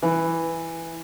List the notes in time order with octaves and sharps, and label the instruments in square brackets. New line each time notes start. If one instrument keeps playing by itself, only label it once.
[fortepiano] E3